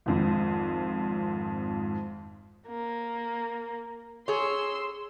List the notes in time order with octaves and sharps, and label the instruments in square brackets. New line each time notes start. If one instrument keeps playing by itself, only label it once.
[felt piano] G#1 F2 G#2
[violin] A#3
[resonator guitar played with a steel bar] G#4 C#5 [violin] C6 E6